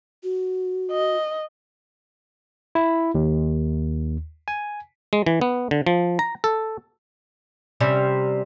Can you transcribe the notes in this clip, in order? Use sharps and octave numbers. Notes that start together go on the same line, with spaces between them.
F#4
D#5
E4
D#2
G#5
G#3
E3
B3
D3
F3
A#5
A4
C3 G3 C#4